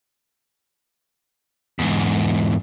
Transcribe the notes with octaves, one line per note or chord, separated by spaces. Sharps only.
E2 G#2